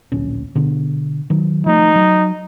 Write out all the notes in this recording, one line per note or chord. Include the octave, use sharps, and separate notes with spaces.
D1 A#1 C#4
B2 D3
D#3 F#3
F3 A3 D#4
F#3